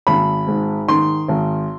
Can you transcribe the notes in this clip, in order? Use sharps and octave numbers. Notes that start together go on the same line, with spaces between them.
G#1 B5
G#2
D#3 C6
G#1